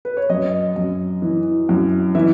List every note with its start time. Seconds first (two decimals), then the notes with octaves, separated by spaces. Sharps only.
0.05 B4
0.17 C#5
0.30 F#2 D#5
0.76 F#2
1.22 E3
1.69 F#2
2.15 E3 E5